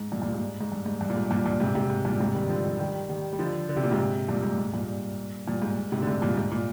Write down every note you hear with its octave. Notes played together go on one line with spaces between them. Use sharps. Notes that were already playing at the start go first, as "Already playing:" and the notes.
Already playing: G#2
G2 A#2
G2 A#2
G#2
G#2
G2
G#2
G2
A#2
G#2
G2 A#2
G2 A#2
G#2 C3
G#2 C3
G#2
G2 A#2
G#2 C3
D#3 G3
D3 F3
D#3 G3
D#3 G3
D#3 G3
G3
D3 F3
D3
C3
A#2
G#2 C3
G2 A#2
G#2
G#2
G2 A#2
G2 A#2
G#2
G#2
G#2 C3
D3
G#2 C3
G2 A#2
G#2
A#2